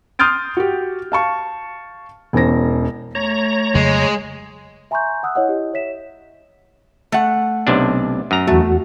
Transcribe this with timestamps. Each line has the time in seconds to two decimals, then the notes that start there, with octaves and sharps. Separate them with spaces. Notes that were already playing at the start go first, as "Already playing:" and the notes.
0.19 C6 D#6 F6 G6 A6 D7
0.57 F#4 G4
1.12 F5 A5 C#6
2.33 E1 E2 C#4 C5 A#6
3.15 A3 C#5 A#5
3.75 F2 C#3 F#3 G#3
4.91 E5 G#5 A#5 C6 C#6 G6
5.23 F#5 D#6 E6 F#6
5.35 E4 C#5 D#5 F#5
5.49 E4 G4 D#5
5.73 C#5 E5 B6 E7
7.12 A3 F#5
7.67 B1 C3 D4
8.31 F#2 A#5
8.47 E2 A3 F#4